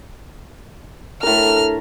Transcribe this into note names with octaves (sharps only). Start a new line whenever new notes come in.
D2 A2 F#4 A4 A#4 F6